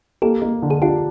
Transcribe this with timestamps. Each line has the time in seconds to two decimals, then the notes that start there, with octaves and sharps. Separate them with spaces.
0.22 A#3 G4 A4
0.42 A#3
0.62 D3
0.70 G#4
0.82 D4 F4 G4